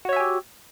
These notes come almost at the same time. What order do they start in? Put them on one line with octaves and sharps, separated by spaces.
F#4 C#5 E5 G#5 G4